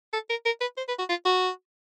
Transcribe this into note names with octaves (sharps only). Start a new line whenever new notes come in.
A4
A#4
A#4
B4
C5
B4
F#4
F4
F#4